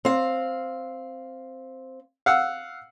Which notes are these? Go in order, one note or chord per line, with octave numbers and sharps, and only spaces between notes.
C4 F5
F5 F#5 E6